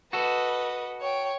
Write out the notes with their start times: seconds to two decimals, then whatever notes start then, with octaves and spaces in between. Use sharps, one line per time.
0.13 F#4 A4 B4 D#5
1.01 C#5 G5